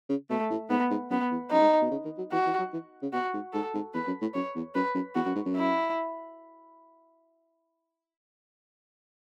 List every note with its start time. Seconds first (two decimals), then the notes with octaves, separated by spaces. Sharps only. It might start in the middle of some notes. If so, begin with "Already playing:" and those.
0.09 C#3
0.30 B2 A3
0.50 A2
0.69 G#2 B3
0.90 G#2
1.10 F#2 B3
1.31 E2
1.51 F#2 D#4
1.61 G#2
1.81 B2
1.91 C#3
2.04 D#3
2.18 F#3
2.32 E3 F#4
2.46 E3
2.58 F#3
2.73 E3
3.02 C#3
3.13 B2 F#4
3.33 G#2
3.53 G#2 A4
3.74 G#2
3.94 E2 B4
4.07 F#2
4.21 A2
4.34 F#2 C#5
4.55 E2
4.75 F#2 B4
4.95 F#2
5.15 E2 F#4
5.26 F#2
5.35 G#2
5.46 F#2
5.56 E4